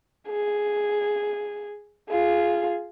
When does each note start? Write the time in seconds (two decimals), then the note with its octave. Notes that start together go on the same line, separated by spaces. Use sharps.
0.29 G#4
2.09 F4 G#4